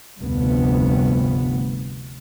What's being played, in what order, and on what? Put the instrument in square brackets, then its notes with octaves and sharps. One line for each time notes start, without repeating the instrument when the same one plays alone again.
[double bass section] F1 D2 G2 B3